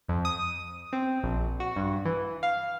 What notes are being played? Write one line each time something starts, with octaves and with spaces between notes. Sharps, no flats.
F2
D#6
C4
A#1
F#4
G2
E3
F5